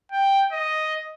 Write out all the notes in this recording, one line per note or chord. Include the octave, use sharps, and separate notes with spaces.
G5
D#5